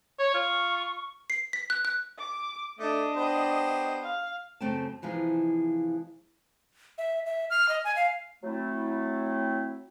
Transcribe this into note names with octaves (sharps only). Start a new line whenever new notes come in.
C#5 C#6
F4
C7
B6
F#6
F#6
D6
A3 D4 D#5 D6
B3 G4 C5
F5
F#2 C#3 A3 C4 G5 A5
C3 E3 F3 G#3 D#4
E5
E5
F6
D#5
G#5
F5
F#3 A3 C4 E4